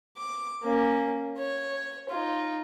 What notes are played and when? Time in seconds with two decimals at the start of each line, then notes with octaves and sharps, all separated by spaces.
0.17 D6
0.63 A#3 C#4
1.38 C#5
2.10 D#4 F4